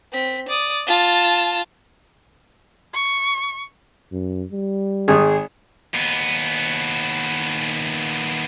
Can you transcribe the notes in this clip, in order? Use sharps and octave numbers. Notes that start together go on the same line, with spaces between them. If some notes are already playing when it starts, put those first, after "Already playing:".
C4 B6
D5 D#6
F4 A5
C#6
F#2
G3
G#1 G#4
D#2 B3